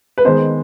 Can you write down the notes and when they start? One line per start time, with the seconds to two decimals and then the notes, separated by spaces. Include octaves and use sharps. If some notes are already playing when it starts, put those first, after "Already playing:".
0.18 B4
0.25 D#3 G#3 B3 C5